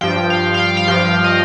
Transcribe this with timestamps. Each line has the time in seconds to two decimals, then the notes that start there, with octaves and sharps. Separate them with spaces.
0.01 G2 F3 G5
0.30 F5
0.54 F5
0.59 G5
0.77 F5
0.88 G2 F3 G5
1.24 D#5